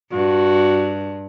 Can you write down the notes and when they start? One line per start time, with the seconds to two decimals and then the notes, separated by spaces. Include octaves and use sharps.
0.12 G2 F#4